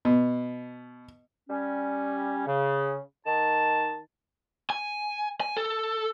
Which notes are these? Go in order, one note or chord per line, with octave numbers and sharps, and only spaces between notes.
B2
G3 C#4
C#3
D#3 A5
G#5
G#5
A4